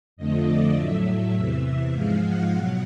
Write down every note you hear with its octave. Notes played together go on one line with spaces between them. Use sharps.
F2 D3 F3 A3 D#5
D5
A2 F#3 A3 E5
E5
E2 C3 E3
G#2 F3 G#3 F5
F#5
B2 F#3 F#5